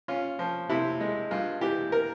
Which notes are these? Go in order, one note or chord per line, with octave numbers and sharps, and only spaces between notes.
C#4 F4
F3
C3 E4
G#3
G2 F4
E3 G4
A#4